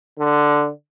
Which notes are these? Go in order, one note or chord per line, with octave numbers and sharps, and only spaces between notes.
D3